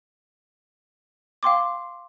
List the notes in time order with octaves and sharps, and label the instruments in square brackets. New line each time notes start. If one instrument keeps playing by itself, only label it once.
[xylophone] F5 G5 C6 D6